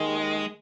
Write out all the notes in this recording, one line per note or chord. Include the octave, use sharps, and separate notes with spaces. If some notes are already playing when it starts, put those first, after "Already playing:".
Already playing: D#2 D#3 G#3